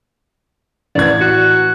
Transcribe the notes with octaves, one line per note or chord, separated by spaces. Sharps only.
A1 D5 G#6
F#4